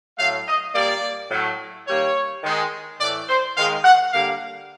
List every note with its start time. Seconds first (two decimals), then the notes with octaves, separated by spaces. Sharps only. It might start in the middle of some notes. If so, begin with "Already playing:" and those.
0.18 A2 F#3 A3 F5
0.47 D#5
0.74 A#2 G3 A#3 D5
1.30 A2 F#3 A3
1.87 D#3 G3 A#3 C#5
2.43 D#3 G#3
2.99 A2 E3 A3 D5
3.28 C5
3.56 D#3 G#3 F5
3.83 F#5
4.12 D3 G3 A#3 F5